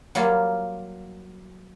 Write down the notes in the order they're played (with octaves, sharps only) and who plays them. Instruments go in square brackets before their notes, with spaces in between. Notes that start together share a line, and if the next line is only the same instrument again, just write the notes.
[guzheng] F#3 G3 A#3 F4